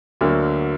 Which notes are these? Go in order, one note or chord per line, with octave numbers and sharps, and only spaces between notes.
D2 D3 F#3 A#3